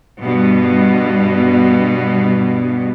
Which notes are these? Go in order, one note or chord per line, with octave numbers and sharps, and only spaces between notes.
G2 B2